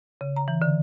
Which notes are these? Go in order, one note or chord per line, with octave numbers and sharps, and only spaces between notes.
C#3
A#5
E3
D3